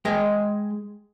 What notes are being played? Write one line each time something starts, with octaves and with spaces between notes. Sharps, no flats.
G#3 G#4 D#5 G5